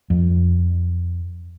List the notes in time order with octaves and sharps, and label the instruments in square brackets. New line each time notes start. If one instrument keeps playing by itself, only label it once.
[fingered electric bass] F2